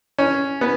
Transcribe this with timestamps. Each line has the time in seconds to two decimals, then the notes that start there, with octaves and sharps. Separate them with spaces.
0.18 C#4
0.61 B3